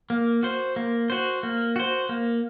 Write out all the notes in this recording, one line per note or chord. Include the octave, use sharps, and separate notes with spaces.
A#3
F#4 C5
A#3
F#4 C5
A#3
F#4 C5
A#3